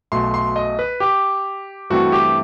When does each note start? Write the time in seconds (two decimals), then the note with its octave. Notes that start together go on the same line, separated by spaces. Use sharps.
0.12 B1 B2 A3 C6
0.34 C6
0.56 D#5
0.79 B4
1.00 G4
1.90 G2 E3 A3 C4 F#4
2.12 G4